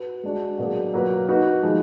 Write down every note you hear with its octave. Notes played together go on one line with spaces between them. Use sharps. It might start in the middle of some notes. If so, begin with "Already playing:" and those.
Already playing: F#4 B4
G#3 D4 F#4
B2 F#3 A#3 D4 G#4
F#3 A#3 F4 B4
A#3 D#4 F#4 B4
F3 G#3 D#4